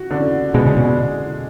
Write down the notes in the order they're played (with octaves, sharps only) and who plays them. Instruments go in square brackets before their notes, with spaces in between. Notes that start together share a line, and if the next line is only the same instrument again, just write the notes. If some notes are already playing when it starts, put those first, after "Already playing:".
Already playing: [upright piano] F#4
D3
[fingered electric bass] B2 [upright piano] G#3
[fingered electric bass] C#3
B2